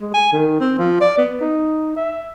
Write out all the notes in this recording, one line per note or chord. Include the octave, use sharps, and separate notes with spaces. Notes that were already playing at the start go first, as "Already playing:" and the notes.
G#3
G#5
D#3
C4
F3
D5
B3
D#4
E5